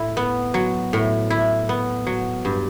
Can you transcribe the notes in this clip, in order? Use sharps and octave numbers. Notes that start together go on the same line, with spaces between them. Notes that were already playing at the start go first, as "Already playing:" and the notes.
Already playing: A2 E4
B3
F#3
A2
E4
B3
F#3
G2